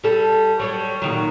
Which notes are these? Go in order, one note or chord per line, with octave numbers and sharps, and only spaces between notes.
G3 A4
F#3 G3 C#5
A#2 D#3 F#3